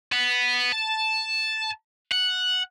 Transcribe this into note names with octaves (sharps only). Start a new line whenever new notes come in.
B3
A5
F#5